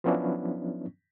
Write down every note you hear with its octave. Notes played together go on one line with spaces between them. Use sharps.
F3 F#3 B3 C#4 D4 E4